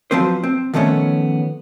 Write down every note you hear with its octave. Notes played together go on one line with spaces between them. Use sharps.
F3 F#3 C4 B4 C5
C4
D#3 F3 A3 B3 C#4